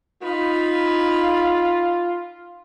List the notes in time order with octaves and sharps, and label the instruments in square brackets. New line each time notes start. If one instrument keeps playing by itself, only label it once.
[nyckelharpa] D#4 B5 [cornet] F4